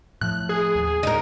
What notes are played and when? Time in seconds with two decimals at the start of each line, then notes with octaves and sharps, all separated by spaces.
0.21 A2 F3 F#6
0.49 G#4
0.75 D#2
1.03 A2 C#3 D#4 A#4